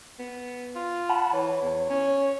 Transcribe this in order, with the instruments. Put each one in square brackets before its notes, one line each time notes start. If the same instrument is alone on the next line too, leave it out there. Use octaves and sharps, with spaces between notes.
[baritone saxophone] B3
F4
[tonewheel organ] F#5 A5 B5
[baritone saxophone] E3 [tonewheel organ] C#5
[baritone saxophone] E2
C#4